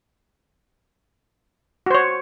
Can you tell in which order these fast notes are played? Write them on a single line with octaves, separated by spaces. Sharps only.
F#4 C5 C#5